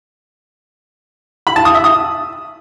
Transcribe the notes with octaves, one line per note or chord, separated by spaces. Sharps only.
B5
A5
D#6
E5
D#6